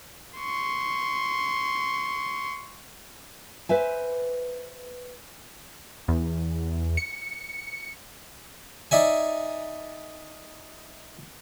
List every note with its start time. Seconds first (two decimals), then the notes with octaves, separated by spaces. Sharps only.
0.39 C6 C#6
3.69 B4 C5 E5 G#5
6.08 E2
6.97 C#7
8.91 D#4 D5 E5 G#5